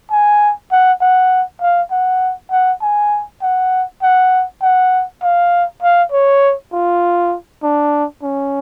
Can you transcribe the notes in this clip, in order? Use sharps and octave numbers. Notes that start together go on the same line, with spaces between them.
G#5
F#5
F#5
F5
F#5
F#5
G#5
F#5
F#5
F#5
F5
F5
C#5
F4
D4
C#4